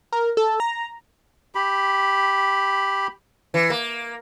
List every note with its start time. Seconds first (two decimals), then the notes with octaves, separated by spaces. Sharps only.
0.12 A#4
0.37 A4
0.60 A#5
1.55 G4 B5
3.54 E3
3.70 A#3